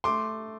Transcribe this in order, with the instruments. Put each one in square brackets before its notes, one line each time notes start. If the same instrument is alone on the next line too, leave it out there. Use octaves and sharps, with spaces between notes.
[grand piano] A3 C6 D6